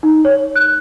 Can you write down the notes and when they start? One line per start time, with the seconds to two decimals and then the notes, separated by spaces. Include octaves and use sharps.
0.03 D#4
0.25 C#5
0.56 F#6